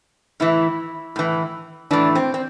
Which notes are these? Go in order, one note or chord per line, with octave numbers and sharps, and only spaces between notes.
A2 E3 E4
A2 E3
A2 E3 D4
C4
C4